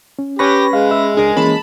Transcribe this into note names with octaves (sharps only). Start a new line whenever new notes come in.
C#4
C#4 G4 B4 B5 C#6 A#6
G#3 F5
G#4 E5 E6
C#2 D4 G#4 A#4
E3 A#3 C#4 A5 B5